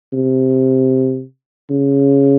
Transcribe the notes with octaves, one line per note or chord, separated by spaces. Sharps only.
C3
C#3